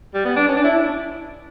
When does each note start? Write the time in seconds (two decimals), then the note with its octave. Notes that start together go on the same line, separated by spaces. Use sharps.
0.14 G3
0.25 B3
0.36 D4
0.48 C#4
0.56 D4
0.64 E4